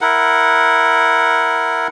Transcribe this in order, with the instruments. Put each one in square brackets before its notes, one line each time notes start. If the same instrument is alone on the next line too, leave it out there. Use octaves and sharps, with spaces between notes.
[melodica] E4 A#4 F#5